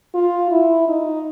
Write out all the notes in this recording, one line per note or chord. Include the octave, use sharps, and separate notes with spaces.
F4
E4
D#4